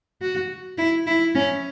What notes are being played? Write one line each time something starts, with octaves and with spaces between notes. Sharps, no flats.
F#4
E4
E4
C#4